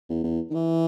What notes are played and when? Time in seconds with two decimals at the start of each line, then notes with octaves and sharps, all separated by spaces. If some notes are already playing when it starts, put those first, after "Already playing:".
0.09 E2
0.24 E2
0.50 D#3
0.54 E3